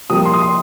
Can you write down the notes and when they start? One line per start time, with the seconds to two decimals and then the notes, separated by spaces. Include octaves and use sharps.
0.10 C2 C3 F3 A#3 D#6
0.25 C6
0.34 D#6
0.42 C6